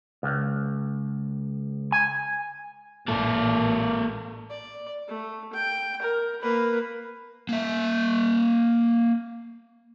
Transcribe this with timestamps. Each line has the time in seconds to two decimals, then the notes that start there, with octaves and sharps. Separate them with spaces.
0.23 C#2
1.92 G#5
3.08 A1 A#2 A#3 A4
4.50 D5
5.08 A3
5.53 G5
6.02 A#4
6.42 A#3 B4
7.49 A#3 E5